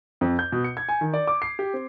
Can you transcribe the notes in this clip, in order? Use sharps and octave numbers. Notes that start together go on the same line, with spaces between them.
F2
G6
B2
C#7
G#6
G#5
D#3
D5
D6
C7
G4
C4